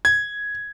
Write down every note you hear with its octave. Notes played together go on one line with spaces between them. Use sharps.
G#6